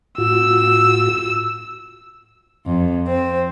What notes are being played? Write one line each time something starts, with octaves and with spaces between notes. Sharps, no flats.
A2 F4 F#4 E6
F2
C4